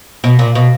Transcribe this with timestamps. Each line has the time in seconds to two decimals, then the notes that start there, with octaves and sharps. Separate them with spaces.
0.24 B2
0.39 A#2
0.55 B2